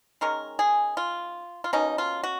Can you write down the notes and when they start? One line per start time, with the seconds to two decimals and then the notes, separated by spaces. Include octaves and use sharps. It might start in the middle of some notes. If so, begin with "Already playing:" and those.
0.21 D#3 G#3 C#4 A#4
0.59 G#4
0.97 F4
1.64 F4
1.73 B2 A#3 C#4 D#4
1.98 F4
2.23 F#4